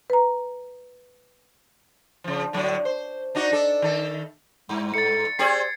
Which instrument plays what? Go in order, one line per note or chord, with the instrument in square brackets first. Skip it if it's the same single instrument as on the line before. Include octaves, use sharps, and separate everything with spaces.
[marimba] B4 A#5
[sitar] C#3 F3
A2 D3 F#3
C5
D4 D#4 F#4
D4 A4
D#3 A4
[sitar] G2 [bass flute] G#3
[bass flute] A4 [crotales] A6 C#7
[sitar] C4 G4 G#4 [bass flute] D5 [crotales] G#6 C7